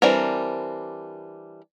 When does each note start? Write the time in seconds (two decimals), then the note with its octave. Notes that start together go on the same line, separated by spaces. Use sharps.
0.02 E3 G3 C4 D4 A#4